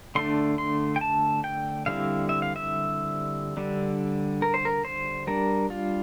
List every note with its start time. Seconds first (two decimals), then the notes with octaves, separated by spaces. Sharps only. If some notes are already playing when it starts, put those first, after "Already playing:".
0.15 D3 A3 D4 C6
0.58 C6
0.96 G5
1.01 A5
1.44 G5
1.86 D3 G3 C4 E4 F5
2.29 E5
2.42 F5
2.56 E5
3.57 D3 G3 D4
4.42 A#4
4.54 C5
4.65 A#4
4.85 C5
5.27 G3 D4 A#4
5.70 F4